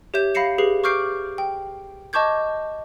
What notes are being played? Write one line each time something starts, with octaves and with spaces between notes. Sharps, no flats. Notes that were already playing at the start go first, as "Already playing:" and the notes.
G4 C#5 E5 G6 E7
F5 B5 A#6 C7 C#7 E7
G4 G#4 B4 C7
C#6 D6 F6 G6 C7 D7
G5
D#5 A5 C#6 D6 G6 G#6